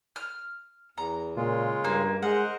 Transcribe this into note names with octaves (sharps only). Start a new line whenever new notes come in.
F6
E2 A#5
A#2 C#3 G#3 F4
G2 A#3
G#3 A#4 C5 D#5 F#5